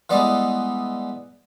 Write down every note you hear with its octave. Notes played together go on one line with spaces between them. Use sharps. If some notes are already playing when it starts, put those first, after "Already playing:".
E3 G3 G#3 B3 D5 D#5